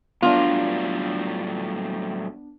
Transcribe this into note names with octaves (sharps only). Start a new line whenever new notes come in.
A2 F#3 G3 B3 D4 F4